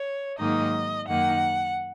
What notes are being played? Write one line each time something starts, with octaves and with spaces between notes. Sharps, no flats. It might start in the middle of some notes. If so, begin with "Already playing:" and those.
Already playing: C#5
G#2 D#3 F#3 A#3 D#4 D#5
F#2 D#3 A#3 D#4 F#5